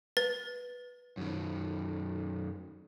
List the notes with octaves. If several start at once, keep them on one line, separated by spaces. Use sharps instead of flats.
B4 A6
F#2 D#3